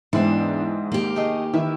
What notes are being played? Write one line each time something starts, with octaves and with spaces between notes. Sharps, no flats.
E2 G#2 E3 C4 D4
D#2 A#3 G4
A3 G#4 D#5
D#3 E4 B4 E5